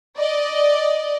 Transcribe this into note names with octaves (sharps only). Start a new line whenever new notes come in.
D5 D#5